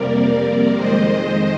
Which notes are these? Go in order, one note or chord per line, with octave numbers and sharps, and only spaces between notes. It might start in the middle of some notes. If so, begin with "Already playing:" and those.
Already playing: F2 C3 G3 A#3 A#4 D5
F2 D#3 G#3 C5 D#5